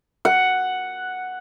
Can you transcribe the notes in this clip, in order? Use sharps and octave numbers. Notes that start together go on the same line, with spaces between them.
F#5